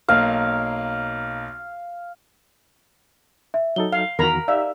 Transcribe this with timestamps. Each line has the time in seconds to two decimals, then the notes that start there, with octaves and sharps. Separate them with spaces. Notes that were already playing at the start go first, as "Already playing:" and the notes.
0.08 B1 A#3 F5
3.54 E5
3.76 F#3 D#4 A4 G7
3.93 F5
4.19 E2 D#3 F#4 A#4 A#5 B5
4.48 D#4 G4 D5 E5 F5